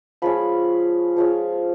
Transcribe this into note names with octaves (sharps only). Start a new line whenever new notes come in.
F3 G#3 C#4 B5
F3 G#3 C#4